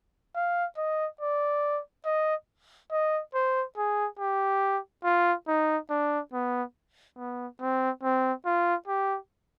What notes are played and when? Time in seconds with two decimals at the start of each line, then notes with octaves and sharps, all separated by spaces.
0.35 F5
0.77 D#5
1.21 D5
2.05 D#5
2.91 D#5
3.34 C5
3.77 G#4
4.19 G4
5.04 F4
5.48 D#4
5.90 D4
6.33 B3
7.17 B3
7.61 C4
8.03 C4
8.45 F4
8.88 G4